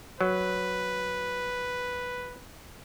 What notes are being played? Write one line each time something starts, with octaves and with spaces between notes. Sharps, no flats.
F#3 B4